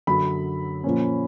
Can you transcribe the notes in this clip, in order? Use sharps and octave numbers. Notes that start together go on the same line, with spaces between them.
F#2 D3 F#3 B5
A#2 F3 A#3 C#4